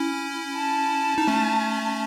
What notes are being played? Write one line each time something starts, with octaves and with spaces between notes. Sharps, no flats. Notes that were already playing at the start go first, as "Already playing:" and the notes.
Already playing: C#4 E4
A5
D#4
A3 C#4